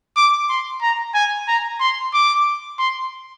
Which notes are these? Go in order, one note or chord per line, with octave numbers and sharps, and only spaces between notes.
D6
C6
A#5
G#5
A#5
C6
D6
C6